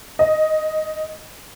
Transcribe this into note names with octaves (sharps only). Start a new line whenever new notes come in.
D#5